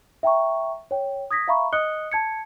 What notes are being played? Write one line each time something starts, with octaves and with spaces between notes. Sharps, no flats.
E5 G5 A#5 C#6
C#5 G5
D#6 G#6 A#6 B6
E5 F5 A#5 B5 C#6
D#5 D#6 F#6 C#7 G7
A5 G#6 C#7